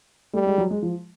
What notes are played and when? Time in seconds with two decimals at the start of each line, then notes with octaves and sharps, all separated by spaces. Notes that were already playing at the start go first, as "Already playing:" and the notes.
0.34 G3 A3
0.46 G#3
0.58 F#3
0.71 G#3
0.82 F3